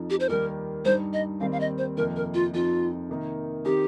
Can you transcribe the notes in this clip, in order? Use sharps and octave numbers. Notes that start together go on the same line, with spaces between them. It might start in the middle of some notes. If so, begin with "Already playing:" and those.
Already playing: F2 F3 D#4
G4
C5
D#2 D#3 G3 A#3 A#4
G2 G3 D#4 C5
D#5
D#2 D#3 G3 C4 F5
F5
D#5
C5
F2 C3 D#3 A#3 A#4
A#4
F4
F2 F3 C4 D#4 F4
C3 D#3 A#3 D#4
D#3 C4 D#4 G4